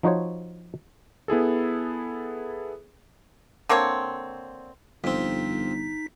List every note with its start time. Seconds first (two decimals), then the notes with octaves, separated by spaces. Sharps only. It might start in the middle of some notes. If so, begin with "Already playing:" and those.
0.03 F3 D#4 F#4 C5 C#5
1.28 B3 E4 G#4 A4
3.69 D3 A#3 C4 C#5
5.04 G1 F2 C4 D#4 B6